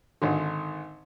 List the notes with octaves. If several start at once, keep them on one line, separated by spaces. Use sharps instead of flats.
G#1 G#2 D3